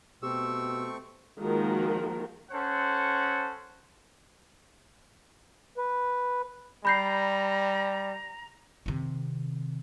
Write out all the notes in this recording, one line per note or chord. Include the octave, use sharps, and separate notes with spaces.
B2 A3 C4 G4 C#6 E6
D#3 F3 G#3 A#3 F#4 A#4
C#4 A4 C5 F#5
B4
G3 A#5 B5 G6 C7
C3 D#3